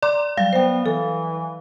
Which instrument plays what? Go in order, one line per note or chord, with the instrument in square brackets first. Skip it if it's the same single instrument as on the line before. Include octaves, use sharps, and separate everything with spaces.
[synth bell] D5 [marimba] A#5 C6 D6
[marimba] F#3 G3 [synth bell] F5
[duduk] B3 [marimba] C5 G5
[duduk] E3 [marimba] A4